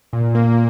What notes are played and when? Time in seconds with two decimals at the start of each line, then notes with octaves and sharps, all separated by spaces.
0.13 A#2
0.35 A#3